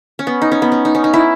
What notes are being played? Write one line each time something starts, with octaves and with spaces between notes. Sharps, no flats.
C#4
B3
D#4
C#4
B3
C#4
D#4
C#4
D#4
E4